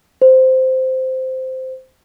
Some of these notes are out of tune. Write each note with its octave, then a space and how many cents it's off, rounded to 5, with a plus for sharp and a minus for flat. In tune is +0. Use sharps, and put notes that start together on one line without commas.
C5 -10